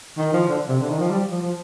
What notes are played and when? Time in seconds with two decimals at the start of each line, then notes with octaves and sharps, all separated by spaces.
0.18 D#3
0.33 F3
0.48 D3
0.69 C3
0.80 D3
0.90 D#3
1.00 F3
1.10 G3
1.31 F3
1.42 F3